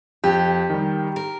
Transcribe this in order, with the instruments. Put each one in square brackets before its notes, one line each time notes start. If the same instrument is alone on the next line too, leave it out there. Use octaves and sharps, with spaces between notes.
[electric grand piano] F2 [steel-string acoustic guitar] G4
[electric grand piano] D#3 G3
[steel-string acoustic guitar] A#4